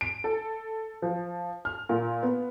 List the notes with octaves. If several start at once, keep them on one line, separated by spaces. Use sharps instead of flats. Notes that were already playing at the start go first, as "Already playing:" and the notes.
D7
A4
F3
F6
A#2
B3